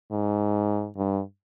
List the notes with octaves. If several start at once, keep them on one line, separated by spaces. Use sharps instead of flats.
G#2
G2